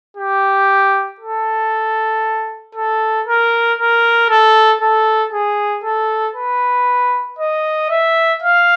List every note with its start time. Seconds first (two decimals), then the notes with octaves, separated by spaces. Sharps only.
0.17 G4
1.20 A4
2.75 A4
3.27 A#4
3.79 A#4
4.30 A4
4.81 A4
5.32 G#4
5.84 A4
6.35 B4
7.39 D#5
7.90 E5
8.42 F5